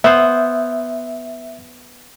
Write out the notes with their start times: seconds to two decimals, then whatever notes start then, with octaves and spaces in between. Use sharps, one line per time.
0.04 B3 C5 E5